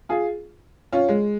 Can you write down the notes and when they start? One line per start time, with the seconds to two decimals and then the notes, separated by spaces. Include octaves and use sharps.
0.09 F4 G#4
0.92 C#4 F4
1.08 G#3